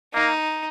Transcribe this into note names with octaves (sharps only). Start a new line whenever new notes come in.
A#3 D#4